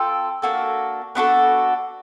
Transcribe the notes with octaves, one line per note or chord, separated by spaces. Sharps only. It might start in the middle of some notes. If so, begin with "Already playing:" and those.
Already playing: C4 F4 A4 G5
A#3 D4 F#4 A4
B3 D4 F#4 A4